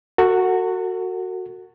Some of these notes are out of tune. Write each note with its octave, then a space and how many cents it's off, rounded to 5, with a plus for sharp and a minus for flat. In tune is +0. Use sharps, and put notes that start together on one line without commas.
F#4 +0 A4 +45